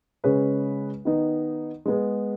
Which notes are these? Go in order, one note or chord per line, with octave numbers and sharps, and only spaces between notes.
C#3 G#3 C#4 G#4 B4
D#3 B3 D#4
G#3 B3 G#4